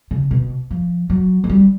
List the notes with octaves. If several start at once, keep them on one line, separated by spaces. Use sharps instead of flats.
C#3
B2
F3
F#3
G#3
G3